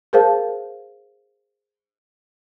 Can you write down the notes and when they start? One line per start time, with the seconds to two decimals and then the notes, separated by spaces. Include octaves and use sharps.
0.13 G#4 A#4 C5 F5 A5